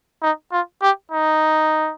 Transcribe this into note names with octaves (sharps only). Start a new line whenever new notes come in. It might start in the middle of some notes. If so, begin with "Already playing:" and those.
D#4
F4
G4
D#4